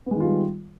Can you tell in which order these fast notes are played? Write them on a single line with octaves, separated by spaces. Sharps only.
B3 G#3 D#3 F4 G3